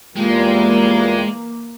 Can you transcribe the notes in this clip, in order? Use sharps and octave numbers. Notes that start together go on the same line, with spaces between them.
E2 E3 G3 G#3 A#3 F4 G5